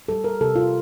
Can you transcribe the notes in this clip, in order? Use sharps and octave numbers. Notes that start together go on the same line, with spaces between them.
G3 A4
A#4
C3 A4
F4